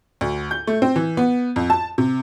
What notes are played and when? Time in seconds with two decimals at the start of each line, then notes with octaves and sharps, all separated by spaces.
0.21 D2
0.51 G6
0.67 A3
0.82 C4
0.96 E3
1.17 B3
1.56 F2
1.70 A5
1.98 C3